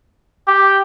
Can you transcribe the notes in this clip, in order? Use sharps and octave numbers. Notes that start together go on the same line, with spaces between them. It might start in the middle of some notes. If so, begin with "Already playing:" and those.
G4